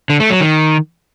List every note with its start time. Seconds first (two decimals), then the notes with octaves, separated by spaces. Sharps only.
0.10 D3
0.20 A3
0.30 F#3
0.40 D#3